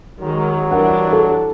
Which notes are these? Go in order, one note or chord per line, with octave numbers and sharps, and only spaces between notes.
D#3 F#3 G#3
E3 G3 D4 A#4 F#5
A4